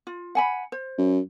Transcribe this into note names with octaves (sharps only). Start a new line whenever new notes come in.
F4
F#5 G#5 B5
C5
F#2